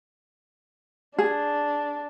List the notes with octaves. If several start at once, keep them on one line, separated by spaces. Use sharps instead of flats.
D4 G#4